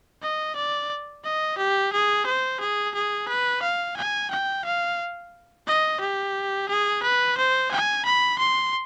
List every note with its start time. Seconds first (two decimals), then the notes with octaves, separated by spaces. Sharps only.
0.22 D#5
0.56 D5
1.24 D#5
1.58 G4
1.93 G#4
2.26 C5
2.60 G#4
2.94 G#4
3.28 B4
3.62 F5
3.96 G#5
4.30 G5
4.64 F5
5.67 D#5
6.01 G4
6.69 G#4
7.03 B4
7.37 C5
7.71 G#5
8.05 B5
8.38 C6